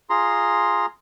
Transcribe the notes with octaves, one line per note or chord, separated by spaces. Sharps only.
F4 G#4 A#5 C6